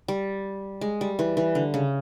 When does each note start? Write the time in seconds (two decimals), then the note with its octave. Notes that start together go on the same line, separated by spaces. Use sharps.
0.08 G3
0.81 G#3
1.01 G3
1.19 E3
1.37 E3
1.55 D3
1.74 C#3